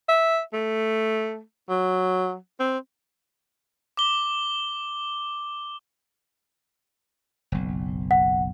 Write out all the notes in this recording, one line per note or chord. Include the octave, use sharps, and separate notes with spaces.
E5
A3
F#3
C4
D6 G7
F#1 B1
F#5